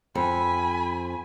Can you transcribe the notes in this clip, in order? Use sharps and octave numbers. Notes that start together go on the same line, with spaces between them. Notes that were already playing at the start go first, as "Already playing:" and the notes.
F2 G#5 B5